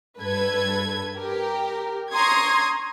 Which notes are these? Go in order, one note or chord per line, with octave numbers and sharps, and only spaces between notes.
G2 A4 B4 G#6
G4 A#4
A#5 C6 C#6 D#6 G#6